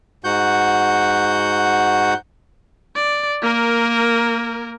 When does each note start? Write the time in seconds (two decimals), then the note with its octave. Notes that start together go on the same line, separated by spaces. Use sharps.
0.24 G#2 F#4 F#5 G6
2.96 D5
3.42 A#3 A#4